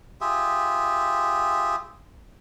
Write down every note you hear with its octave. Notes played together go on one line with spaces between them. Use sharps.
F4 G4 G#4 E5